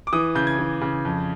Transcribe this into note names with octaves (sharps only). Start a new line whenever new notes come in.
D6
E3 D#6
C#3 G6
G#6
E3
C#3
F2